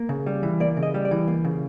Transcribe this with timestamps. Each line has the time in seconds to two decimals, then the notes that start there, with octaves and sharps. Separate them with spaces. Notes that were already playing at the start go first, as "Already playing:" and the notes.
Already playing: A#3
0.09 C#3
0.27 G3
0.43 E3
0.60 A#3 D5
0.77 C#3
0.83 D#5
0.94 G3
1.05 D5
1.11 E3
1.28 A#3
1.45 C#3